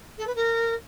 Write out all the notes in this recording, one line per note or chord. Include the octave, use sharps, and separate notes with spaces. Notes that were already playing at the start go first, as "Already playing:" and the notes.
A4
B4
A#4